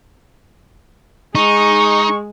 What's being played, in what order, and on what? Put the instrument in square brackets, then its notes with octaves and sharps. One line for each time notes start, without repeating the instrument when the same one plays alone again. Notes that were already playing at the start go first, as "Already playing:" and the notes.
[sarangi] G#3 [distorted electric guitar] D#4 [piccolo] C#6